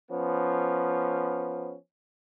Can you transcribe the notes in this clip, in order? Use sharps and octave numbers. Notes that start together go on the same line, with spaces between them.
F3 B3 C#4